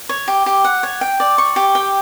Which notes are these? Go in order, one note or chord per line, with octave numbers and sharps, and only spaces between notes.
C#5
G4
G4
F#5
C#5
G5
D5
C#6
G4
G5